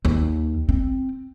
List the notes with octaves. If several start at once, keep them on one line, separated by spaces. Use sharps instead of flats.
D#2
C4